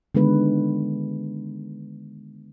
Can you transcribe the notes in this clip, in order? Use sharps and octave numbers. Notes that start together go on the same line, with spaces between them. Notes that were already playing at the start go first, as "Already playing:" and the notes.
D3 D#3 G#3 B3 B4